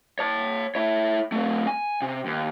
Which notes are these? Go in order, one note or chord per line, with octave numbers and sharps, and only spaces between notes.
C#5 A5
E4 C#5
A3 C4
G#5
C3
D#2